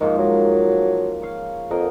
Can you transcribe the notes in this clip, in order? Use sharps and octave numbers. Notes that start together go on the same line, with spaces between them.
G#2 D#3 F3 A#3
F#3
C#5 F5
F2 A#4 D#5 F#5